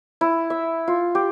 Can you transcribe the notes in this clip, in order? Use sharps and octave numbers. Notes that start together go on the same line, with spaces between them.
E4
E5
F4
G4